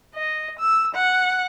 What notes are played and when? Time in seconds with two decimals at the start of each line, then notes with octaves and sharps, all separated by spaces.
0.15 D#5
0.59 E6
0.95 F#5